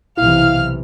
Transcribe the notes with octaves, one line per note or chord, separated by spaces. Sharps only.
B1 C3 E3 E4 F5 F6